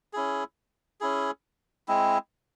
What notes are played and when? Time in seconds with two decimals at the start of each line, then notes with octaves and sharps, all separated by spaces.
0.13 C#4 E4 G#4
1.01 C#4 E4 G#4
1.88 G#3 C4 E4